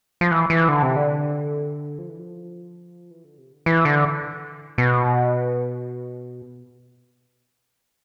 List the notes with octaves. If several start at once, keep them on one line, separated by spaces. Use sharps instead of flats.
F3
E3
E3
D3
C3
D3
F3
E3
F3
E3
D3
C3
D3
E3
D3
B2